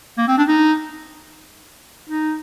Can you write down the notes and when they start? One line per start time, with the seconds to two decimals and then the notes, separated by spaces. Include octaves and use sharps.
0.18 A#3
0.28 C4
0.38 D4
0.48 D#4
2.10 D#4